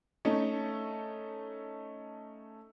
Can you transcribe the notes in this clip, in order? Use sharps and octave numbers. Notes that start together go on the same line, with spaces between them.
A3 C#4 D#4 A4